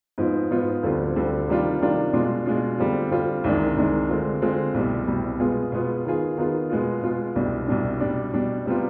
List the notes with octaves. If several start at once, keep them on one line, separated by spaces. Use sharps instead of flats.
G#2 F3 B3 F4
G#2 F3 B3 F4
D2 D3 G3 C4 F4
D2 D3 G3 C4 F4
C3 D#3 G3 D4 F4
C3 D#3 G3 D4 F4
B2 G#3 D4 F4
B2 G#3 D4 F4
D3 G3 C4 F4
D3 G3 C4 F4
C2 C3 D#3 G#3 D4
C2 C3 D#3 G#3 D4
D3 G#3 C4 F4
D3 G#3 C4 F4
C2 B2 G3
C2 B2 G3
B2 G#3 B3 F4 G#4
B2 G#3 B3 F4 G#4
D#3 B3 F4 G#4
D#3 B3 F4 G#4
B2 G#3 B3 F4
B2 G#3 B3 F4
C2 B2 G3 D4
C2 B2 G3 D4
B2 G3 D4
B2 G3 D4
C3 G3 B3 F4